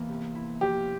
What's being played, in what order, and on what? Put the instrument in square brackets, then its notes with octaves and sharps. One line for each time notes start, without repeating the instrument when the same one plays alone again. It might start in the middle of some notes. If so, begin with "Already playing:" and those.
Already playing: [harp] E2 E3 A#3
C3
E4
[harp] F3 [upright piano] G4